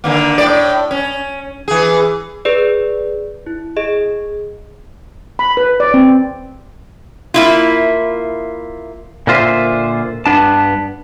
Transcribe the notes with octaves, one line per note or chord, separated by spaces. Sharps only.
D3 D#3 A#3
A2 D5
C#4
E3 G#4
G#4 B4 D5
E4
G#4 D#5
B5
B4
D5
C4
A#3 E4 F4
A#2 D3 F4 C5 E5
G2 B3 D4 A5